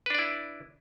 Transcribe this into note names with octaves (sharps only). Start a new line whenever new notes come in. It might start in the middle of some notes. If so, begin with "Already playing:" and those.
D4 E4 B4 D5